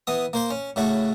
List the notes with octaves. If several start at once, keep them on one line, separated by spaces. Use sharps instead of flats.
E3 B3 D#6
A#3 C5 C6
C#4
A2 C#3 A3 F#4